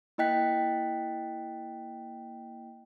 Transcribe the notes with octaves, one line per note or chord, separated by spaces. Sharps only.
A#3 E4 D#5 G5 F#6 B6